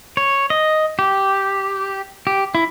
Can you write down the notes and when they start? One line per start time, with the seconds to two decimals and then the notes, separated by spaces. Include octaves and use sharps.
0.17 C#5
0.50 D#5
0.99 G4
2.27 G4
2.55 E4